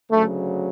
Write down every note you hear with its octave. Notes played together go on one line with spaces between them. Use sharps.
D2 C#3 F#3 A3